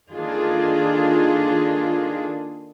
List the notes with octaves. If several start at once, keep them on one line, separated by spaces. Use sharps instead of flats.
D#3 A#3 D4 F4 G#4 A4